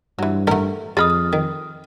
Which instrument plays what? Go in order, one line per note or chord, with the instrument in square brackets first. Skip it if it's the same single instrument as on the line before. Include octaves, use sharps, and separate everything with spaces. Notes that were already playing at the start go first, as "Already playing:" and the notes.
[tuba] G2 [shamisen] E3 F#3
[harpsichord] A1 F#5 [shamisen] A3 A#4
[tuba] F2 [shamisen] G#4 D#5 B5 [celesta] D#6 F6 A6
[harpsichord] D#3